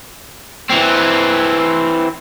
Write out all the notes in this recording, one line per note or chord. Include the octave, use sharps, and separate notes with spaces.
E3 C4